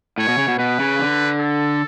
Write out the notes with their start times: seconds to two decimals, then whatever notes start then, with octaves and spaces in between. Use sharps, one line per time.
0.18 A2 C#5
0.28 B2
0.38 C#3
0.48 B2
0.59 B2 B4
0.80 C#3
0.99 D3
1.40 A4